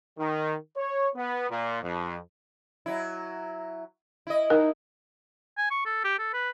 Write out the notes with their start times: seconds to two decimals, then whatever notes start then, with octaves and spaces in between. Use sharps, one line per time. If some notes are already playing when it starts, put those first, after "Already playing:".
0.18 D#3
0.76 C#5
1.16 B3
1.50 A#2
1.83 F2
2.86 F#3 E4
4.27 E4 D#5
4.50 D#4 A#4
5.58 G#5
5.71 C#6
5.86 A4
6.05 G4
6.19 A4
6.34 B4